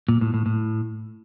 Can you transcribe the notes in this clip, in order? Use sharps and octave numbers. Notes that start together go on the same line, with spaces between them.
A#2
A2
A2
A2